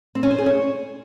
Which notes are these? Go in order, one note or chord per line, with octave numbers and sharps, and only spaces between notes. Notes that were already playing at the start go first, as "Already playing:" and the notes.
C4
C#4
C5
G#4
C#5